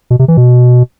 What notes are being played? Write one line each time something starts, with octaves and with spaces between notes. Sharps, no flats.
B2
C3
E3
B2